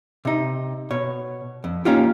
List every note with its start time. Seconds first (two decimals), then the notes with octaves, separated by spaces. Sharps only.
0.25 C3 D#4
0.91 B2 C#5
1.64 F2
1.85 A#3 C#4 D#4 F4 G4